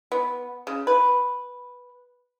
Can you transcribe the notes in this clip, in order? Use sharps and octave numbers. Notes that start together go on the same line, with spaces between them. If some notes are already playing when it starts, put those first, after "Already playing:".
B3
C#3
B4